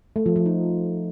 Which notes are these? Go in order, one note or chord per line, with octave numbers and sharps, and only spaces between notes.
A3
F3
F3
D#4